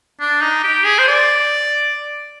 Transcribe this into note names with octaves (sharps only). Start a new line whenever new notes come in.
D4
D#4
G4
G#4
C5
D5